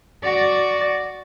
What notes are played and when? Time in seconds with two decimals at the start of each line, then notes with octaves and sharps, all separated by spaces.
0.23 F#4 D5